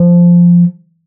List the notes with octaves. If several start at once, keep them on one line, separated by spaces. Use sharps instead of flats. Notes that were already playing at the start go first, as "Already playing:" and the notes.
Already playing: F3